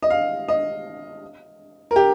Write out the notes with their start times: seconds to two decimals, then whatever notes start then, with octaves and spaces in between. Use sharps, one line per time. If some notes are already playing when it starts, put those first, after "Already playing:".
0.02 D#5
0.10 F5
0.48 D#5
1.91 A#4
1.96 G4